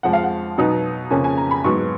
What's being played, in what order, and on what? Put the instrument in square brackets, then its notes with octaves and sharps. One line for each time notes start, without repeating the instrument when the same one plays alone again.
[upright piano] F2 F3 G#3 F#5
F5
F#5
B2 F#3 B3 D#4
F2 C#3 F3 A#3 C#4 G#5
G#5
A#5
B5
G#2 F#3 B3 C#6